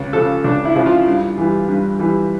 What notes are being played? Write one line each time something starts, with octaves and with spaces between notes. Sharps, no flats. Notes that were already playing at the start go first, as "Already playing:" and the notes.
Already playing: C#2
C#3 F3 A4
C#2 D4
E4
C#3 F3
F4
G2
E3 G3
G2
E3 G3